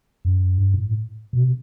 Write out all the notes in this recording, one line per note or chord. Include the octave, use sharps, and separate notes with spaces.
F#2
G2
A2
B2
C3